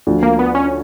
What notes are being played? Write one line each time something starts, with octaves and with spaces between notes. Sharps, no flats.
D2 D3 F3
A#3
B3
C#4